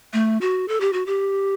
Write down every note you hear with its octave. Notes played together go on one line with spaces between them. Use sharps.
A3
F#4
A4
G4
F#4
G4